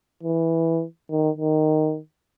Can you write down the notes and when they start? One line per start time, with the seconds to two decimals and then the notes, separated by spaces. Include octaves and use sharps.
0.23 E3
1.10 D#3
1.38 D#3